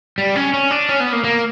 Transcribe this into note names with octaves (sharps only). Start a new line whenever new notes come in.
G3
C#4
C#4
D4
C#4
B3
A#3
A#3